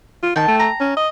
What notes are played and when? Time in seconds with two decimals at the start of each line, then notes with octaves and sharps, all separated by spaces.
0.23 F4
0.36 D#3 G5 A5
0.48 A3
0.60 A#5
0.80 C#4
0.96 D#5